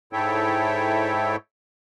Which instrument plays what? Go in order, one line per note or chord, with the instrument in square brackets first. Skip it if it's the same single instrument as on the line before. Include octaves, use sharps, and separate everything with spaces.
[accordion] G#2 E4 A4 C#5 E5 G5